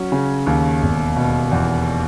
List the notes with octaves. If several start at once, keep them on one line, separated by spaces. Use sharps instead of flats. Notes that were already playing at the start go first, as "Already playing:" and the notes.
Already playing: F#3 C#4
C#3
D#2
E1
B2
E2